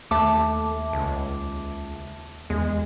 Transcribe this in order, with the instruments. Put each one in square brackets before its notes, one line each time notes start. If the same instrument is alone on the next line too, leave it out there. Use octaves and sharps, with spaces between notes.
[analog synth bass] D#2 [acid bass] A3 [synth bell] E5 A5 D6
[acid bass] C#2
[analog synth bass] E2 [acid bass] G#3